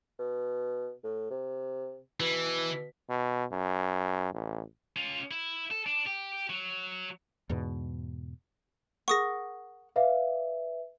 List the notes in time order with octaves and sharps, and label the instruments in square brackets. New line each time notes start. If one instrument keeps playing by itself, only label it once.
[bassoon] B2
A2
C3
[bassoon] B2 [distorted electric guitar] E3
[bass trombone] B2
F#2
A1
[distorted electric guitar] C#4 F4
E4
A4
D4
G4
F#3
[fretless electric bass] E2 G#2 B2
[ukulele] G#4 A#4 F#5 [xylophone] C#6 D#6 A#6
[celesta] B4 E5 [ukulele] D5 F5